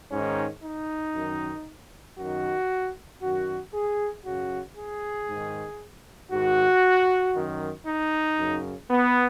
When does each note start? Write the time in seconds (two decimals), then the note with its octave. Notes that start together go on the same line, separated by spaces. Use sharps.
0.12 G#2 D#3 C#4
0.64 D#4
1.15 F#2 D#3
2.18 F#2 D#3 F#4
3.22 F#2 D#3 F#4
3.74 G#4
4.25 F#2 C#3 F#4
4.78 G#4
5.29 G#2 D#3
6.32 G#2 D#3 F#4
7.36 F#2 D#3
7.87 D#4
8.39 F#2 C#3
8.91 B3